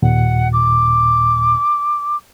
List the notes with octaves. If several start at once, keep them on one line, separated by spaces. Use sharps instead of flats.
D#2 A#2 F#5
D6